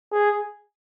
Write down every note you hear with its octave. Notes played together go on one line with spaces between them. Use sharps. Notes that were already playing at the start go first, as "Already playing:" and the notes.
G#4